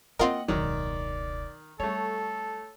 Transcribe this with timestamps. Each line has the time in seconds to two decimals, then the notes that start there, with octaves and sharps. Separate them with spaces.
0.19 A#3 C4 E4 F4 A#4 D#5 F#5 G5
0.48 E1 C#2 D#3 F#3 D5
1.80 G3 A3 A4 C#5